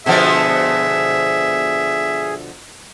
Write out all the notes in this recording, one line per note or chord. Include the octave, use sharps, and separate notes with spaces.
B2 D3 F3 G#4 E5